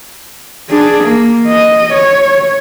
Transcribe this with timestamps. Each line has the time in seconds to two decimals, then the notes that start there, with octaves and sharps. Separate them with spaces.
0.70 D4 G#4
1.04 A#3
1.47 D#5
1.94 C#5